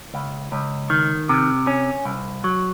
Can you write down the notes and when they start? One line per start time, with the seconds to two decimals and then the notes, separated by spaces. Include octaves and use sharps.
0.14 C#2
0.52 C#2
0.90 D#3
1.29 C3
1.67 C#4
2.05 C2
2.44 F#3